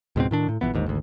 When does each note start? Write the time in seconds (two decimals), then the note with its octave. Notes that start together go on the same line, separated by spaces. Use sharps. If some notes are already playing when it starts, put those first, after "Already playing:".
0.16 C#2 G#2 B2 C4
0.31 A2 D#3 D4
0.48 A2
0.61 A#1 F2 E3 B3
0.74 G1 D#2 G#2
0.86 G#1 D2